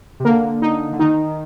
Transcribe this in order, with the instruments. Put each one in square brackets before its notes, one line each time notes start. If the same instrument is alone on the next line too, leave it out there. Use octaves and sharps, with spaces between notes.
[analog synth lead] C3
[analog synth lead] D3 [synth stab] A#3
[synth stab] D#4
[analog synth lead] D3
[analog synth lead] D#3 [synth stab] D#4